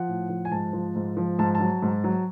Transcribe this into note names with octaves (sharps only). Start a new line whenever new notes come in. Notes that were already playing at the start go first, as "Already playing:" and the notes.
Already playing: F3 F#5
A2
F3
G#5
G#2 A5
F3
G#2
F3
G#2 A5
A5
F#3
G#2
F#3